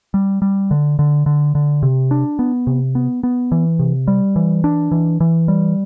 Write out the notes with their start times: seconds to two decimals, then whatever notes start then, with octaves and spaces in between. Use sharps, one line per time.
0.14 G3
0.42 G3
0.71 D3
0.99 D3
1.26 D3
1.55 D3
1.83 C3
2.11 D4
2.39 B3
2.67 C3
2.95 B3
3.23 B3
3.52 E3
3.79 C3
4.08 G3
4.36 E3
4.64 D4
4.92 E3
5.20 E3
5.48 G3